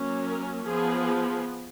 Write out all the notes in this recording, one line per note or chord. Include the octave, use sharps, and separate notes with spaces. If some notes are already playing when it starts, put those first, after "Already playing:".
Already playing: F#3 A#3 C#4
A#4
F3 B3 G#4